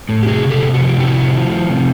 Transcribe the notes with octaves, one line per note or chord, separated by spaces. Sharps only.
A2
G4
C3 F#4 G#4
C3
G4 A4
C3
F#4
F3
G4
C3 E4 F#4
F3
F3
F3
C3